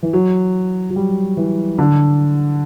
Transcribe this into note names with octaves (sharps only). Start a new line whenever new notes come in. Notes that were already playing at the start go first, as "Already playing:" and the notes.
E3
F#3
F#3
G3
E3
D3